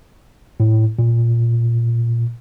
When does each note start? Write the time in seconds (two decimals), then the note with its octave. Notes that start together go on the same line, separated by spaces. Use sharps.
0.60 A2
0.99 A#2